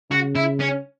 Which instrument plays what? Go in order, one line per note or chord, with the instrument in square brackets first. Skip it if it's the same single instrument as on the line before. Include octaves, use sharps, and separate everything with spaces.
[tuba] C#3 [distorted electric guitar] F#4
[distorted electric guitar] E4
C#4